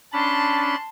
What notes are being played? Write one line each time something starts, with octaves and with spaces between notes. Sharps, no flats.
C#4 D4 A5 B5 C6